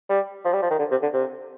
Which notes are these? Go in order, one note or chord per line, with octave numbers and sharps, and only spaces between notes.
G3
F3
G3
F3
D#3
D3
C3
D3
C3